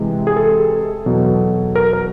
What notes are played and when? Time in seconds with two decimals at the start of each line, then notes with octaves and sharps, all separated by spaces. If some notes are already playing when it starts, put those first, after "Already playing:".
Already playing: C3 E3 G#3 C4
0.27 G#4
0.37 A4
1.06 E2 B2 F#3
1.76 A#4
1.93 A#4